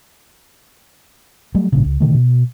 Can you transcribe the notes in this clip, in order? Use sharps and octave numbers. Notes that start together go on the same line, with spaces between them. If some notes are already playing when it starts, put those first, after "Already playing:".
F#3 G3 A3
A1 G2 A#2 C#3
C#2
B2 D3 D#3 A3
B2